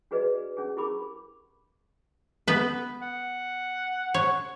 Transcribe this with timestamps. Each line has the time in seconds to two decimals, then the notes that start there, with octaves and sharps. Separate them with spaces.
0.11 D4 F#4 G#4 B4 D5 D#5
0.57 C#4 D4 G#4
0.77 E4 G4 G#4 A#4 B5 D6
2.48 B3 B4
3.01 F#5
4.14 C#5